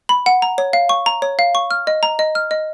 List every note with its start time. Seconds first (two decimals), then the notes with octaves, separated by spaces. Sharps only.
0.09 B5
0.26 F#5
0.42 A#5
0.58 C#5
0.73 F5
0.89 C#6
1.06 A#5
1.22 C#5
1.39 F5
1.55 C#6
1.71 F6
1.87 D#5
2.03 A#5
2.19 D#5
2.35 F6
2.51 D#5